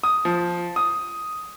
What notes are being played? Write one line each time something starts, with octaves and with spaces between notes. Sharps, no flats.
D#6
F3
D#6